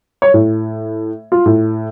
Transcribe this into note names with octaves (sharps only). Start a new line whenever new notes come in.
C#5
A2
F4
A2